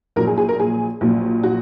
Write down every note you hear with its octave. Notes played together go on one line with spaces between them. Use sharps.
A#1 A#2 F#3 A#4
G#4
G#4
A#4
G#4
A#1 A#2 F#3
F#4